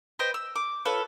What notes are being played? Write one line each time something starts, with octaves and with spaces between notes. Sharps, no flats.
B4 C5 D#5 G5
E6
D6
F4 A4 B4 C#5